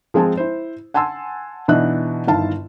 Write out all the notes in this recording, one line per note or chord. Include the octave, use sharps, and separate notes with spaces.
F3 G#3 C4 G#5 A5
E4 C5
F#5 G#5 A5 C6 E6
B2 E3 D4 D#4 E5 F#6
G1 D#3 E4 F5 A5